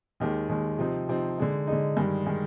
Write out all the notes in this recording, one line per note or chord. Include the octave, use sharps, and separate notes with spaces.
D#2 D#3 G#3
D#2 D#3 G#3
C3 F3 C4 D#4
C3 F3 C4 D#4
D3 G#3 D#4
D3 G#3 D#4
G2 D#3 G#3
D#3 G#3